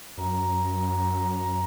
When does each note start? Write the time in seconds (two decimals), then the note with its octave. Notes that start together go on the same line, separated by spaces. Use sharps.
0.18 F#2 A#5